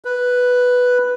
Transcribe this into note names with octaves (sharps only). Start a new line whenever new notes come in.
B4